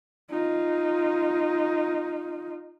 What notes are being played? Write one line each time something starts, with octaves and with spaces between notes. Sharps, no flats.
D#4 F4